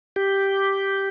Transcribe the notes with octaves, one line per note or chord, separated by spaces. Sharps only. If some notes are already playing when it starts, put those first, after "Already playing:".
G4